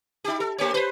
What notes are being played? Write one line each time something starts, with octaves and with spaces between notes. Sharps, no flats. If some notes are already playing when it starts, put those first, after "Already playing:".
D#4 G4
A4
A3 G4 C#5
B4 C5